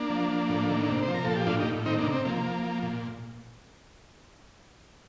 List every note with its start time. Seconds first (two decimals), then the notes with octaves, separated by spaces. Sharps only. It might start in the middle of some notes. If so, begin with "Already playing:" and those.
Already playing: A#3 D4
0.10 F3
0.30 F3
0.49 A2
0.70 D#3
0.88 C3
1.03 F3 C5
1.14 A#4
1.24 A#2 A4
1.36 G4
1.47 A2 D4 F4
1.60 D#4 G4
1.66 A2
1.86 D#3 C4 D#4
1.99 A#3 D4
2.05 C3
2.12 C4
2.25 F3 A#3
2.44 F3
2.63 F3
2.83 A#2